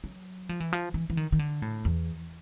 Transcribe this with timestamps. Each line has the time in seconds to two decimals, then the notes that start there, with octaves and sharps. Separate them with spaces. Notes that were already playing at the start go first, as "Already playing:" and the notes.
0.04 F#3
0.49 F3
0.60 E3
0.73 F3
0.94 E3
1.10 E3
1.17 D#3
1.32 D#3
1.39 D3
1.62 A2
1.85 E2